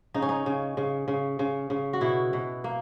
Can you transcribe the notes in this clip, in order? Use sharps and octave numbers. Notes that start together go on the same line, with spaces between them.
C#3 D#4
C#4
D#4
C#3
C#3
C#3
C#3
C#3
F#4
B2 E4
B2
A#3